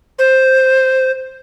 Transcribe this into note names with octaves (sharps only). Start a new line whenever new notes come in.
C5